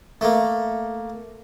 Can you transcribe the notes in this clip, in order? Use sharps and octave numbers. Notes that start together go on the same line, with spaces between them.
A3 A#3